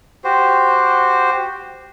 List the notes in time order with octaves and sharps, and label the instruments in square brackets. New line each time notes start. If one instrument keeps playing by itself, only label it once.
[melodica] F#4 G4 C5